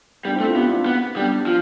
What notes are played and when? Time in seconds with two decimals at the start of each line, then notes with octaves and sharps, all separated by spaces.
0.25 G3 B3 D4
0.35 C4 E4
0.40 A3
0.45 D4 F4
0.55 B3 E4 G4
0.70 D4 F4
0.86 B3
1.16 G3 B3 D4
1.46 F3